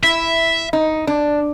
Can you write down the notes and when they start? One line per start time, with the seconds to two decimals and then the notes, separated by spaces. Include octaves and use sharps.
0.03 E4 E5
0.73 D#4
1.07 D4